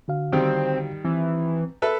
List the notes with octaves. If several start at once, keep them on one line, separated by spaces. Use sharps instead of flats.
D3 F#4 F5
D#3 G3 C4
E3 C4
A4 B4 E5